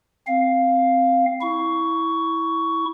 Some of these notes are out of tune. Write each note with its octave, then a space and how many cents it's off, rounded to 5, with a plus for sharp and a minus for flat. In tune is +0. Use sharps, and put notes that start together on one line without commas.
C4 +0 F5 +0
E4 -10 C#6 +15